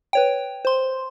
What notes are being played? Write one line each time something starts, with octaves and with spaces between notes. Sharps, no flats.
B4 C#5 G5
C5 C6